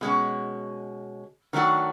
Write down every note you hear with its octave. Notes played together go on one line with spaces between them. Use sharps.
B2 G#3 C#4 F#4
D#3 F#3 A3 D4 F#4